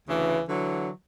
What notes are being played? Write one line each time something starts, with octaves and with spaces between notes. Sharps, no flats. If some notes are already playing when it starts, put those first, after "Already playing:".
D2 C#3 E3
D3 E3 F#3